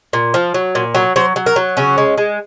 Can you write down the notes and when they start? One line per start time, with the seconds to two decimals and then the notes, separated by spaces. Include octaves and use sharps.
0.13 A#2
0.34 F3
0.54 F#3
0.75 A#2
0.95 F#3
1.16 F#3 C5
1.36 F#3
1.46 A#4
1.56 F#3
1.77 C#3 C#4
1.98 G#3
2.18 G#3